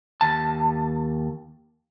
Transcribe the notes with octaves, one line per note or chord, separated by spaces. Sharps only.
D#2 A5